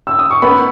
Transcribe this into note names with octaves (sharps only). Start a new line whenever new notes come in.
E6
D#6
C#6
B3 B5